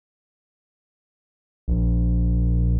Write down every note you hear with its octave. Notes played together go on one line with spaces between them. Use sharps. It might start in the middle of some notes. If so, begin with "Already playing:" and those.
A#1